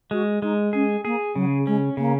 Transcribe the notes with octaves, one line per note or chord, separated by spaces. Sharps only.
G#3 F#4
G#3 D#4
C#4 G#4
A#3 G#4
C#3 F#3
G#3 C#4
C#3 A#3